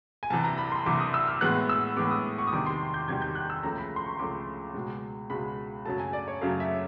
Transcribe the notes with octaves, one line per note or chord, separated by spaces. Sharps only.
G#5
C2 C3 E3 A5
A#5
B5
C6
C2 C3 E3 D6
D#6
E6
F6
A2 E3 G#3 B3 F#6
E6
A2 E3 G#3 B3 D6
D#6
C#6
D#6
E2 C3 D#3 G3 D6
C6
G6
E2 C3 D#3 G3 G#6
G6
F#6
E6
C#2 C#3 F3 A3 A#5
B5
C6
C#6
C#2 C#3 F3 A3 D6
C#2 B2 G#3
C#2 B2 G#3 B5
F#2 C#3 F#3 A3 A5
G#5
D5
C#5
F#2 C#3 F#3 A3 F5
E5